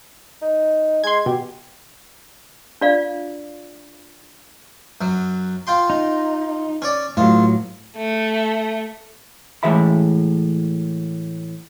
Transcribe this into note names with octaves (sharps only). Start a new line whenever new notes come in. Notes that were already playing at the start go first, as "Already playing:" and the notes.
D#4
G#3 C6 G#6
B2 G4
D4 F4 D5 F5
F#2 F#3
F4 G5 C6
D#4
C#4 C#5 D5
A1 A2 F#3 F4
A3
A2 E3 G#3 E5 B5